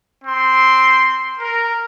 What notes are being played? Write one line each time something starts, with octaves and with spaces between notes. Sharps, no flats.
C4 C6
A#4